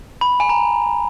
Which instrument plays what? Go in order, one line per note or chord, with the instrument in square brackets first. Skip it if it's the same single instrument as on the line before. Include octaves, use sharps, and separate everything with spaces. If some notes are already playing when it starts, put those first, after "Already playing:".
[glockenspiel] B5
G#5
A#5